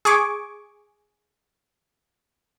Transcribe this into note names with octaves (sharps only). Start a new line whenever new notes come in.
G#4 G#5 C#6 D6